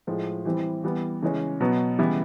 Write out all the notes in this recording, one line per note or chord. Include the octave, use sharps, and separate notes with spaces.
A2 F3 G#3
E3 G3 C4 E4
E3 G3 B3
C#3 E3 G#3 C#4
B2 F#3 B3
C#3 E3 G3 B3 E4